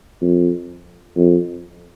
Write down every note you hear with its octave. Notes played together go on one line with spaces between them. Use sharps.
F2
F2